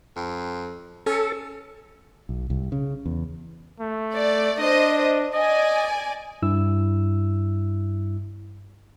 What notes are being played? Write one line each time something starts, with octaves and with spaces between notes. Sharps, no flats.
F2
C#4 A4
B1
C2
C#3
E2
A3
D5
D4 C5 D#5
D5 D#5 G#5
G2 E4 E6